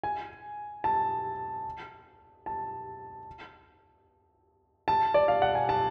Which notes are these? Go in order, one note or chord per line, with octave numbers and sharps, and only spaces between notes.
G#5
A5
A5
A5
D5
F5
F#5
G#5
A5